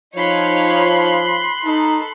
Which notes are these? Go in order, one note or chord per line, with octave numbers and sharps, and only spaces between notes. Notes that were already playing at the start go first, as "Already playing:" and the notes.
F3 D#4 C#5 F5 B5 C6 F#6
D#4 A4